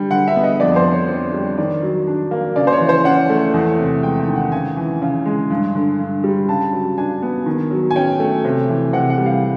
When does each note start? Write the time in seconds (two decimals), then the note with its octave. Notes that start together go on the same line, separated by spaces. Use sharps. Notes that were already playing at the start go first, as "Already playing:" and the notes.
Already playing: D3 G3
0.11 D3 F#5
0.28 E5
0.36 B3
0.43 D#5
0.60 F2 D5
0.76 C5
0.85 D3
0.93 C#5
1.09 C4
1.34 G3
1.58 D#3 D5
1.83 F#3
2.07 D4
2.31 A#3
2.56 C#3 D5
2.67 C5
2.72 C#5
2.80 E3
2.89 C5
3.05 C#4 F#5
3.30 A3
3.54 E2
3.79 C3
4.03 G#3 G5
4.19 G5
4.28 D#3
4.36 F#5
4.52 C#3 G#5
4.76 E3
5.02 C#3
5.25 G#3
5.50 G2
5.75 D3
5.99 G2
6.24 G3
6.48 C#3 A5
6.73 F#3
6.98 D4 G#5
7.22 B3
7.46 D#3
7.71 F#3
7.90 G#5
7.96 C#4 G5
8.20 A3
8.45 C3
8.69 E3
8.93 C3 F#5
9.10 F#5
9.18 G3
9.26 F5